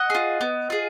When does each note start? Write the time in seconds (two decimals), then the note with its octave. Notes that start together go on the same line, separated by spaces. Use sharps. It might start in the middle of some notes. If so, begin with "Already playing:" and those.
Already playing: D#5 F#5
0.10 F4 G#4
0.41 B3
0.70 F4 G#4